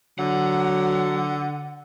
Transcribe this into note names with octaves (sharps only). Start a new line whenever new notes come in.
D3 F#3 F#5